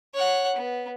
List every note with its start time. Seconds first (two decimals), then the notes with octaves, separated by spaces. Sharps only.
0.14 C#5 F#5
0.57 B3